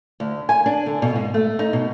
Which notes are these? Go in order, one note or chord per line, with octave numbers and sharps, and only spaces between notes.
D2
G#5
D4
D3
B2
G#2
A3
D#4
B2